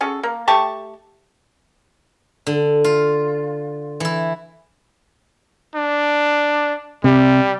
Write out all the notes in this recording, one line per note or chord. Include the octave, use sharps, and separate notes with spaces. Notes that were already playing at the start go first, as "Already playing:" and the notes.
C#4 F#4 G#4 A4
A#3
A3 G4 A5 C#6
D3
F4
E3 E4
D4
C3 G3